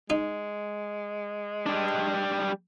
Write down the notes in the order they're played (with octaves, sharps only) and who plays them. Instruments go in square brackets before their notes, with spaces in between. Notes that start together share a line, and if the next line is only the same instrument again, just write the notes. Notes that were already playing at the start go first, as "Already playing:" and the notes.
[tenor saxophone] G#3 [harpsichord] D#4
[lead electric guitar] G3 D4